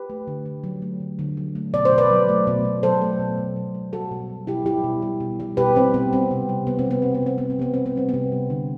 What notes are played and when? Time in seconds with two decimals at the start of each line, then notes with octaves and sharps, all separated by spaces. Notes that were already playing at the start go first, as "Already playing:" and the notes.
Already playing: G4 B4
0.10 A3
0.27 D3
0.46 D3
0.64 F#3
0.82 A3
1.00 D3
1.19 D3
1.37 F#3
1.55 A3
1.74 B2 D5
1.85 C5
1.92 B2
1.98 B4 D5
2.10 F#3
2.29 A3
2.47 B2
2.65 B2
2.83 F#3 A4 C5
3.02 A3
3.19 B2
3.38 B2
3.56 F#3
3.75 A3
3.93 G3 F#4 A4
4.11 B2
4.30 G3
4.47 B2 E4 G4
4.66 G3 E4 G4
4.84 B2
5.02 G3
5.20 B2
5.40 G3
5.57 B2 G4 B4
5.75 G3 C4
5.94 B2 B3
6.13 G3 C4
6.31 C3
6.49 G3
6.67 C3 B3
6.79 C4
6.86 G3 B3
7.02 C3 C4
7.15 B3
7.23 G3 C4
7.38 C3 B3
7.50 C4
7.59 G3 B3
7.74 C3 C4
7.86 B3
7.96 G3 C4
8.09 B3
8.14 C3
8.32 G3
8.50 D3